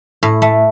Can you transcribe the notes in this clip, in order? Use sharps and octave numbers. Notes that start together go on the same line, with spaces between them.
A2
A3